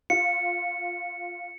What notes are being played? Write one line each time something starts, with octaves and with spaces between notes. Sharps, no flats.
F4 C#7